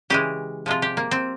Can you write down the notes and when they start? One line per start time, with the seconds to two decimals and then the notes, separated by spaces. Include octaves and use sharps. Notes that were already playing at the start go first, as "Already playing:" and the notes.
0.10 C#3 E3 G#3 G4
0.66 C3 F3 G#3 F4
0.82 G4
0.97 A#3
1.11 C4